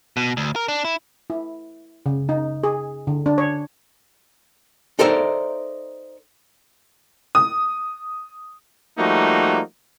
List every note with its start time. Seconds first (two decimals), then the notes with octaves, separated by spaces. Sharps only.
0.17 B2
0.37 D2
0.56 A#4
0.68 D4
0.84 E4
1.30 E4
2.06 C#3
2.29 D#4
2.64 G#4
3.07 D3
3.26 D4
3.38 C#5
4.99 D#4 A4 A#4 C5 D5 E5
7.35 D#6
8.98 F3 G3 A3 A#3 D#4 F#4